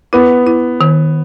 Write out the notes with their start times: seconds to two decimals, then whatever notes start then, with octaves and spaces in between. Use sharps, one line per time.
0.13 B3 E4
0.46 E4
0.81 D#3